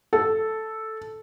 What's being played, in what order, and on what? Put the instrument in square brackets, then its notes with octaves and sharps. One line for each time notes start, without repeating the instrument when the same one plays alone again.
[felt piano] A4